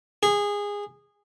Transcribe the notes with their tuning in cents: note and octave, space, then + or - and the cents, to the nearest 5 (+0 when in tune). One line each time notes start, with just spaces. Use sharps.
G#4 -20